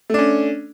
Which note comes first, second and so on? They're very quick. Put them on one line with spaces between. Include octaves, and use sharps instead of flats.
A3 D4 C#4